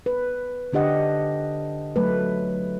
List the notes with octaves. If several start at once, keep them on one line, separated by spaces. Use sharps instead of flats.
B4
D3 D4 G4 D#5 F#5
F#3 A3 B4